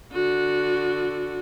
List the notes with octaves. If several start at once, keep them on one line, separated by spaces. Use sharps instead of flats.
D3 F#4